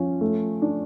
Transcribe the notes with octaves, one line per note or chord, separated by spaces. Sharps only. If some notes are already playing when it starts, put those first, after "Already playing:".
Already playing: F3 C#4
A3
D4